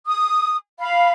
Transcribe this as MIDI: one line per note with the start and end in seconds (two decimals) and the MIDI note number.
0.07 0.56 87
0.79 1.13 77
0.79 1.13 83